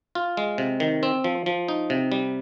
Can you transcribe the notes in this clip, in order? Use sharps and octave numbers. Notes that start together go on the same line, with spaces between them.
F4
G#3
C3
D#3
C4
F3
F3
D#4
C3
G3